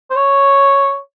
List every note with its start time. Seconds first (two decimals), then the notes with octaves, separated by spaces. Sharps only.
0.10 C5
0.16 C#5